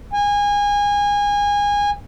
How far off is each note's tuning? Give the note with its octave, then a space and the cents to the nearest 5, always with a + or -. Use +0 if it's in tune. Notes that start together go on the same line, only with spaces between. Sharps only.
G#5 -25